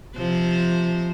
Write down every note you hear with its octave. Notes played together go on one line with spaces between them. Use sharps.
C3 F3 C5